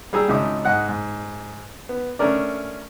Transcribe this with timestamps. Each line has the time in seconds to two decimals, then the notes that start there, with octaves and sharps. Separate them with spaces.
0.13 G3 G#4 A#5 E6
0.28 G#1 C#2 D#4 E5 D6 D#6
0.65 G#2 D#5 F#5 F#6
0.89 G#2
1.89 B3
2.19 A3 C#4 D4 A#4 D5